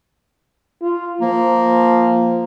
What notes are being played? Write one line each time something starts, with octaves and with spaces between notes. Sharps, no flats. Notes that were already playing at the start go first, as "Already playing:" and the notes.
F4
F3 A#3